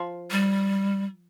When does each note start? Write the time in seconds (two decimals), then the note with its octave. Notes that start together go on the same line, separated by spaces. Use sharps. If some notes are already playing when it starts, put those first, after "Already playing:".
Already playing: F3
0.31 G3